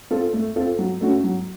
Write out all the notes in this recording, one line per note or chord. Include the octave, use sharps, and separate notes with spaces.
C4 F4 A4
A3
C4 F4 A4
F#3
A3 C#4 F#4
F#3